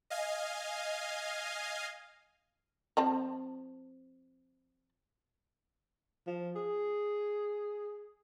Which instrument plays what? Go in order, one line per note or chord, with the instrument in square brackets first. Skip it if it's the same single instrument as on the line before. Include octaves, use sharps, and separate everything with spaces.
[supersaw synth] D#5 F5 G#5
[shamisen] F3 C4 A5
[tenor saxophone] F3
G#4